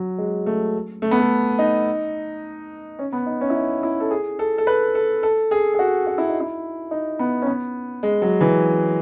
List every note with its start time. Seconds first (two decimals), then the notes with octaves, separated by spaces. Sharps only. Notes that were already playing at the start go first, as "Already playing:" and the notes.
Already playing: F#3
0.18 G#3
0.46 A3
1.02 A3
1.11 B3
1.19 A3
1.59 D#4
2.99 C#4
3.13 B3
3.26 D#4
3.41 C#4
3.50 E4
3.55 D#4
3.83 E4
4.00 A4
4.11 G#4
4.39 A4
4.58 A4
4.67 B4
4.95 A4
5.23 A4
5.51 G#4
5.74 G#4
5.79 F#4
6.07 F#4
6.18 E4
6.29 D#4
6.40 E4
6.91 D#4
7.19 B3
7.42 C#4
7.47 B3
8.03 G#3
8.22 F#3
8.41 E3